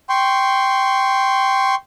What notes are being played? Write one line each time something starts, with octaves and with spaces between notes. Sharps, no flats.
G5 C6 C#6